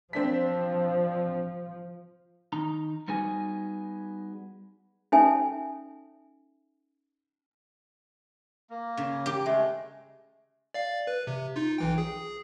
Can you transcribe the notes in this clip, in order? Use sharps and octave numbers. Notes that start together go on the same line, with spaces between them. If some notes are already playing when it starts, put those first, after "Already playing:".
F3 C4 D4 B6
D#3 D#4 A#5
G3 B3 D#4 F#4 G#4 G#5
C#4 D#4 A4 E5 G#5
A#3
C#3
G4
G#3 A3
D5 F5
B4
C3
D#4 F4
B1 E3 G5
G#4